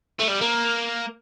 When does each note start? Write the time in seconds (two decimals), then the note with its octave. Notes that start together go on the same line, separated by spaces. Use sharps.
0.19 A3
0.28 G3
0.41 A#3